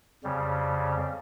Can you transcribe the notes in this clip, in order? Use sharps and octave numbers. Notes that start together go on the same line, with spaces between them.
F2 C#3 G3